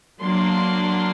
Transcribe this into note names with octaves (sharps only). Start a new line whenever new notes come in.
F#3 A#3 D4 C6